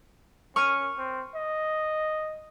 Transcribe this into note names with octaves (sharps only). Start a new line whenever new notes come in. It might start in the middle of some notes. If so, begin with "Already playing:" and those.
C#4 C#6 F6 D#7
C4
D#5